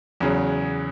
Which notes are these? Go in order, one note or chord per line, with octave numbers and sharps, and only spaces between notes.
E2 C#3 F#3